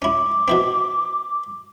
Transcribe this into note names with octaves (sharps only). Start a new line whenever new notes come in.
C#4 E4 D6
B2 E3 C4